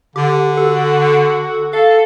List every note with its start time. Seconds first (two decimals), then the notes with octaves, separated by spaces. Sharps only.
0.16 D3 G4
0.57 F#4 A4
1.73 A4 F5